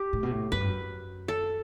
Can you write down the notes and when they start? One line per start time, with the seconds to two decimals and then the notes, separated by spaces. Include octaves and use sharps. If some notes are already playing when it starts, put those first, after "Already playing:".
Already playing: G4
0.13 A2
0.23 B2
0.31 A2
0.52 F#2 B4
0.60 G2
0.68 F#2
1.28 A4